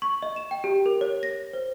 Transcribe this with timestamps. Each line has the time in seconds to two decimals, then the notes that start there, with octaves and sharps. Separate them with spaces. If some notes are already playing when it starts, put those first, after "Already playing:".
0.02 C#6
0.23 D#5
0.36 E7
0.51 G5
0.64 G4
0.86 A#4
1.01 C#5
1.23 A#6
1.53 C5